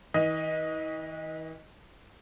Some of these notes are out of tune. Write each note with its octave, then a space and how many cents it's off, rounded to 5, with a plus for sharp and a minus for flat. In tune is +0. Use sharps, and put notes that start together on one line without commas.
E3 -45 D#5 +5